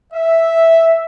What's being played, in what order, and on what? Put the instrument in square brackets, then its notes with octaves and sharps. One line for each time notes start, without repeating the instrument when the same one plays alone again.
[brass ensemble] E5